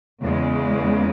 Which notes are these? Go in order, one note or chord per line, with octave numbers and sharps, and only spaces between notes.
E2 C#3 G#3